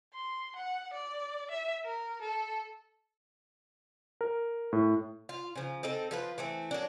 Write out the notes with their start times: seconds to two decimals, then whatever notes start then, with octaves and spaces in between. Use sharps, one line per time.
0.14 C6
0.56 F#5
0.93 D5
1.51 E5
1.85 A#4
2.21 A4
4.21 A#4
4.73 A2
5.29 F4
5.56 C#3 F3
5.83 C4 D#4 A4
6.11 F3 F4 B4
6.38 E3 A3 C4
6.71 F#3 A#3 D4